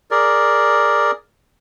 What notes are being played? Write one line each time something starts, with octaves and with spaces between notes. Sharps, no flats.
G#4 A#4 D5